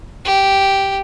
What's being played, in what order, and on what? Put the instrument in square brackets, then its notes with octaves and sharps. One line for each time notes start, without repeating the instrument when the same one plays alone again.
[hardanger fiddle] G4